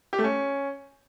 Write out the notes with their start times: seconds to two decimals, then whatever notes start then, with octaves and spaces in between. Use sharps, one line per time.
0.13 G4
0.18 A3
0.24 C#4